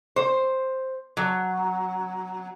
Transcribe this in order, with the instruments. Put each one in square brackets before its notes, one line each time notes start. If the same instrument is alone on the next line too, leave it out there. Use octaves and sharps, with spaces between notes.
[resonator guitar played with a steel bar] C5
F#3